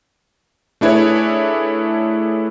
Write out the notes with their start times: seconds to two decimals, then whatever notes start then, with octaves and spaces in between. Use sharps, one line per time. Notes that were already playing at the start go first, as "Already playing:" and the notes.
0.81 A3 D4 E4 G#4 B4 C#5